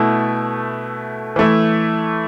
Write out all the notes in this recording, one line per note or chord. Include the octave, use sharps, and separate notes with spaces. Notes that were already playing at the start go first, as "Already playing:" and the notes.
Already playing: B2 A3 E4
E3 A3 E4